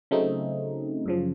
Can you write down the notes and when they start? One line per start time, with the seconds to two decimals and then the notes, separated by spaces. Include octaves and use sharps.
0.11 C#3 F#3 A3 C4 D#4
1.06 F#2 C#3 F3